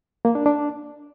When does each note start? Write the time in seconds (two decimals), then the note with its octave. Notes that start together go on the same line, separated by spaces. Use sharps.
0.25 A#3
0.35 D4
0.46 D4